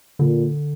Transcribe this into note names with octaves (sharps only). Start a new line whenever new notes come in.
A#2 D3